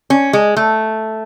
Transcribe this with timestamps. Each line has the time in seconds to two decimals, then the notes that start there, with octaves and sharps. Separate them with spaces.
0.10 C#4
0.33 G#3
0.57 A3